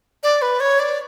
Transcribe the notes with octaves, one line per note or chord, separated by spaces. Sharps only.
D5
B4
C#5
D5